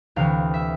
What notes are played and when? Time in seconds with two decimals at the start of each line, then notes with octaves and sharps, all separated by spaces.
0.16 D2 C3 E3 F5
0.54 E5